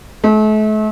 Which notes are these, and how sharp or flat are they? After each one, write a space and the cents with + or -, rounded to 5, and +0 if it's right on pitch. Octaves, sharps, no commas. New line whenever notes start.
A3 -40